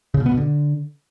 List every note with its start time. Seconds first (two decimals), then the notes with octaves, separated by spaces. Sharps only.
0.14 C#3
0.20 B2
0.26 B3
0.32 B2
0.37 D3